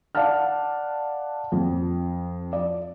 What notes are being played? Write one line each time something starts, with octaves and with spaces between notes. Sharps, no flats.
D5 F5 F#5 A5 F6
F2
D5